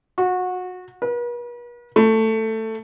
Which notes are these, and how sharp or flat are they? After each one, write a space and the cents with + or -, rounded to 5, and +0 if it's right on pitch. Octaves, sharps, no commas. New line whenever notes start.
F#4 -25
B4 -45
A3 +10